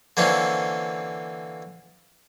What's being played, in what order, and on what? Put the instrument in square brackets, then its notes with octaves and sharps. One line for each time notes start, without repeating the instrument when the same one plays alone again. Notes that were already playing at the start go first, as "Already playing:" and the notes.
[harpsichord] D3 E3 A#3 C4 C#4